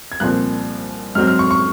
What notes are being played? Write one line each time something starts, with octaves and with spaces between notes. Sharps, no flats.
G#6
C2 A#2 F3 C4 F#6
G#2 F#3 C4 F6
F6
C#6
C#6